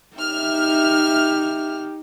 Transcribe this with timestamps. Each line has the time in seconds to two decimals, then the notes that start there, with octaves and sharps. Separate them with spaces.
0.18 D#4 G4 E5 F6